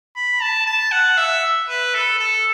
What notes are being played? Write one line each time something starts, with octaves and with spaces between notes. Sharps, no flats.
B5
A5
A5
F#5
E5
B4
A4
A4